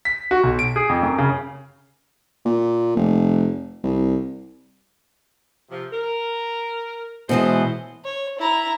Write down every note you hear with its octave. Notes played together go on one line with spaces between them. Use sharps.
B6
F#4
B1
D7
G#4
F2
F#2
C#3
A#2
F1
C2
C3 F3
A#4
B2 E3 G#3 C#4 F#4 C5
C#5
E4 A#5